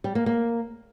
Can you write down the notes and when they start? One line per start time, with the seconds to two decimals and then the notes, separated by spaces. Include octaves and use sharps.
0.04 G3
0.15 A#3
0.26 A#3